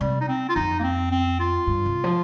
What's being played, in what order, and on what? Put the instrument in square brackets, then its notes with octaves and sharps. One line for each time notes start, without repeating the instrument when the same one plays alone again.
[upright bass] C3 [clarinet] G3
[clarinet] D#4
C4
F4
[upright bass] F2 [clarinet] D#4
[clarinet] A#3
C4
C4
F4
[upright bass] G2
C3
F3